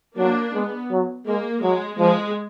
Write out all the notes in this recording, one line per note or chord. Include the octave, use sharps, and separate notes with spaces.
F#3 A#3 D4
G#3 B3
F#3
G#3 A#3
F#3 G#3
F3 G#3